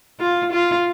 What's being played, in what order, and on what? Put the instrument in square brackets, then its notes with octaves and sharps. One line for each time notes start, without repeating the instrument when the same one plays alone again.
[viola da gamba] F4
F4